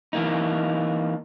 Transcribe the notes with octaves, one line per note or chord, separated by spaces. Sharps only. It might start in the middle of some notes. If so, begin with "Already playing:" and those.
E3 A#3 D#4